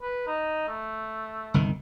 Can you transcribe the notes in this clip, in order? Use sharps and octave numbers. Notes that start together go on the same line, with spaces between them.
B4
D#4
A3
G1 C2 D#3